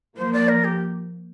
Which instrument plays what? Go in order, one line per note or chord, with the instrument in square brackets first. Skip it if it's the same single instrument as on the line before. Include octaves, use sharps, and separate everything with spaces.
[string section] F3 A#3 [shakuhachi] C5
[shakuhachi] D5
A#4
G4